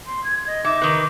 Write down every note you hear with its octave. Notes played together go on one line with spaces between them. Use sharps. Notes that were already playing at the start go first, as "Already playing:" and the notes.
C6
G#6
D#5
D#4 E5 D6
D#3 B4